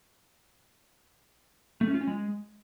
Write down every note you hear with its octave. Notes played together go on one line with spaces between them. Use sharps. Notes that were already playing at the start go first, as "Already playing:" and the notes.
A3
C#4
F4
C#4
G#3